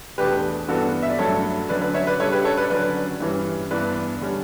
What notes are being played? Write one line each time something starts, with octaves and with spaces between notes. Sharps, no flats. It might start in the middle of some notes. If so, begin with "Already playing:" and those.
E2 B2 A3 D4 G4 B4
G2 E3 B3 D4 F#4 A4
E5
D5
G2 F#3 A3 D4 A4 C#5
D3 F#3 C#4 B4 D5
B4 D5
C#5 E5
B4 D5
C#3 G3 D4 A4 C#5
G4 B4
A4 C#5
B4 D5
D3 F#3 C#4 B4 D5
G2 E3 G3 C#4
G2 E3 B3 D4 B4 D5
D3 G3 C#4